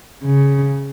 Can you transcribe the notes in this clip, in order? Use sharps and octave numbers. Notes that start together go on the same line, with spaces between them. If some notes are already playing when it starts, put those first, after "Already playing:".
C#3